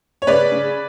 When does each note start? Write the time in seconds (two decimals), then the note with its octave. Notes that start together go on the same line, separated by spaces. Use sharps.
0.22 C#5
0.27 C#3 B4 D5
0.52 C#3